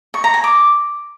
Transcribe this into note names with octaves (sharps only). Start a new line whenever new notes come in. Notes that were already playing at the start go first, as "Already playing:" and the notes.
C#6
A#5
G#5
D6